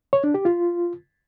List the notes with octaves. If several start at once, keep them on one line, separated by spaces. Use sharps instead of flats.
C#5
D4
G4
F4